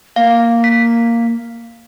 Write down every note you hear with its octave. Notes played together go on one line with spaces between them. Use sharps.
A#3 F5
B6